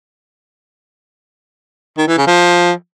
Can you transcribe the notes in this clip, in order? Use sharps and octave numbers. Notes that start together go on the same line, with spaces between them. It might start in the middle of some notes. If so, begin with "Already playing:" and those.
D#3
E3
C#3
F3